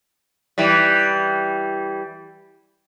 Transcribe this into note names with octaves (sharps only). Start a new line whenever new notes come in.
E3 G3